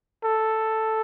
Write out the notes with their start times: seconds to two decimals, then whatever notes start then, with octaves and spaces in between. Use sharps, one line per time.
0.24 A4